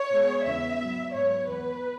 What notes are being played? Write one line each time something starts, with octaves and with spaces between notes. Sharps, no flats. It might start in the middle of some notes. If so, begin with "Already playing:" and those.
Already playing: C#5
B2 G#3 B3
E2 C#3 E3 B3 E5
G#2 F#3 B3
G#2 F#3 B3 C#5
E2 E3 B3 B4